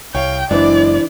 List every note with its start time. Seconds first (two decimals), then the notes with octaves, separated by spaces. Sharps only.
0.15 C2 C#5 F5 G5
0.51 F#1 F#2 E3 G#3 C4 D4 E4 D5